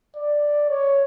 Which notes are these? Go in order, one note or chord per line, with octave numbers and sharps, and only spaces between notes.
D5
C#5